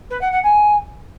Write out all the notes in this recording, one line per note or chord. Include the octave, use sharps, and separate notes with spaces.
B4
F#5
F#5
G#5